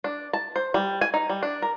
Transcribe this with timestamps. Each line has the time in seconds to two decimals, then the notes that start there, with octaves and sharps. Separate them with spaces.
0.04 D4
0.33 A5
0.56 C5
0.74 G3
1.01 G#5
1.14 D#4
1.29 G3
1.43 D4
1.62 A#4